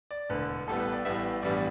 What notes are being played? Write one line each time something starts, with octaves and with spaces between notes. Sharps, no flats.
D5
E1 D2 D3 B4
A1 A2 G3 B3 A4
B4
D5
A1 A2 G3 B3 E5
A1 G2 E3 G3 B3 D5